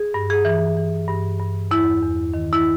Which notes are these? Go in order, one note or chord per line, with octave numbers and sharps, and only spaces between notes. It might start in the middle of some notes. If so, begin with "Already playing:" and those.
Already playing: G#4
G2
G#4
E3
E3
G2
G2
E2 E4
E2
D#3
E4